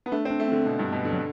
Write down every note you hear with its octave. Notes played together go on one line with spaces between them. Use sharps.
B3
A3 D4
C4
D4
A3
D3 C4
B2
G2
B2
D3
F#3